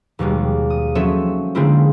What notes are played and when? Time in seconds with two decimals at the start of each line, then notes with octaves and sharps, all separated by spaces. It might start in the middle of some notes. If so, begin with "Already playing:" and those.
0.19 D#2 B2 G3 G#3
0.70 D#6
0.95 F#3 C4 C#4 A4 C#5 E5
1.55 D3 G#3 A#3 C4 E4 F4